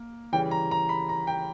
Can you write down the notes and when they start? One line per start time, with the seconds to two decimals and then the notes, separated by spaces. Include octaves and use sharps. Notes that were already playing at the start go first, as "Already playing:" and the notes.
Already playing: A#3
0.33 C#3 E3 G3 C#4 G5
0.51 A#5
0.71 A#5
0.89 B5
1.09 A#5
1.27 G5